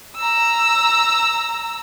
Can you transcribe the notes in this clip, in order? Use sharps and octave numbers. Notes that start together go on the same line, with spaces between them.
A#5 E6